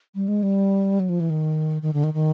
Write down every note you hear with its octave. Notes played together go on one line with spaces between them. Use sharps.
G3
G#3
G3
F#3
F3
E3
D#3
D#3
D3
D#3
D#3